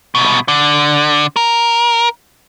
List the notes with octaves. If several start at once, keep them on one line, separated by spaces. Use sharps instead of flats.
C2 B2
D3
A#4